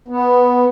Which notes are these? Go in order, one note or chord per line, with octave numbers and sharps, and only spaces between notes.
B3